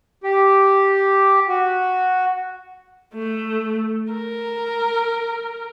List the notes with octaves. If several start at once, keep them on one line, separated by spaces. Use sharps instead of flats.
G4
F#4
A3
A#4